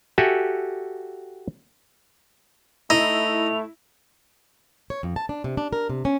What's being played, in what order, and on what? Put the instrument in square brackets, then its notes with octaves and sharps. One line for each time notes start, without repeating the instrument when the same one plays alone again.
[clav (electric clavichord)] F#4 G4 A4 E5 F#5 G#5
[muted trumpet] A3 [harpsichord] D#4 [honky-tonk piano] E4 [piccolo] F7
[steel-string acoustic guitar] C#5
F2
A5
D4
C3
D4
A#4
C3
C#4